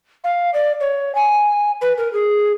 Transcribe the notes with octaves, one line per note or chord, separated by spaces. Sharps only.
F5
D5
C#5
G#5
B4
A#4
G#4